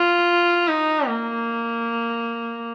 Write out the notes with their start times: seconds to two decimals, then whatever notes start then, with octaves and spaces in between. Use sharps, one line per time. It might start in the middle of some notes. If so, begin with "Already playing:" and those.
Already playing: F4
0.68 D#4
1.07 A#3